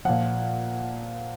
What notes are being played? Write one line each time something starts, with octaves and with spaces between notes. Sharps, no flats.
A#2 F3 F#5